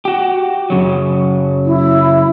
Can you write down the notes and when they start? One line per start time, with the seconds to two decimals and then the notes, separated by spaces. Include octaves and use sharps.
0.05 F#4 G4
0.70 F#2 C#3 F#3
1.65 E4